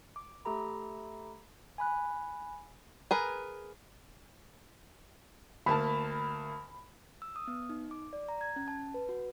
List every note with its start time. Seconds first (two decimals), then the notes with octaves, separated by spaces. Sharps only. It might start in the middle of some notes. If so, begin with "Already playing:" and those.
0.16 D6
0.45 A3 G4 A4 A#5 B5
1.78 G#5 B5 F#6
3.11 G#4 A#4 B4
5.66 D2 A#3 A5 B5
7.22 E6
7.36 D#6
7.48 B3
7.69 D#4
7.91 D6
8.13 D5
8.29 A#5
8.41 G#6
8.56 C#4
8.68 A5
8.94 B4
9.09 F#4